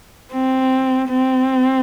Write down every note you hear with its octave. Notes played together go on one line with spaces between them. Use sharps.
C4
C4